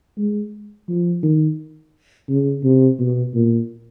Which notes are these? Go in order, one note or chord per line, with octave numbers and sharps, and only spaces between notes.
G#3
F3
D#3
C#3
C3
B2
A#2